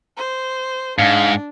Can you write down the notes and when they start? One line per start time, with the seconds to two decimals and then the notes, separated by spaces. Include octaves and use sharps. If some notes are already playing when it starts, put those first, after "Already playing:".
0.17 C5
0.99 G#2 D4 F5